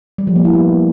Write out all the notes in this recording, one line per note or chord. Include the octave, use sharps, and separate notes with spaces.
G3
F3
A#3
E4
B3